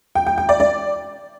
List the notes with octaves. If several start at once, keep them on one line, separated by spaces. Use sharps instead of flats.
G5
G5
G5
D5
D5